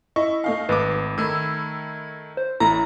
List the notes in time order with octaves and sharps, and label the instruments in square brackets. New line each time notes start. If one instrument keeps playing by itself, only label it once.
[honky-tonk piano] E4 [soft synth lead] D#5 [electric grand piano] C#6
[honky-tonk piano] A3 D#4 F5
[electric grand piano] G#1 A3 D6 [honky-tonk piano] D#4 [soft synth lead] B4
[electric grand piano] D#3 A3 [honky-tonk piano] B5 E6 [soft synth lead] G#6
[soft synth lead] C5
[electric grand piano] A1 [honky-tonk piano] A3 [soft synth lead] E4 [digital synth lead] A#5